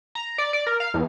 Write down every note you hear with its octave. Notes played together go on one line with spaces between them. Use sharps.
A#5
D5
D5
A#4
F5
E2